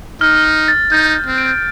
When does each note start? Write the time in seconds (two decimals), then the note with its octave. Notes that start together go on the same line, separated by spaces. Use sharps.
0.21 D#4 F6
0.44 F6
0.68 A6
0.92 D#4 G6
1.15 G6
1.26 C4
1.38 D7